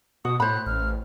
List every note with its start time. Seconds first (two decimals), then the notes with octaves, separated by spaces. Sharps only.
0.25 B2 F#4 D#6
0.40 A2 C5 B5 F#6
0.66 A1 F6